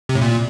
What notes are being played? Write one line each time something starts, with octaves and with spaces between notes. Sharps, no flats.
C3
A2
A#2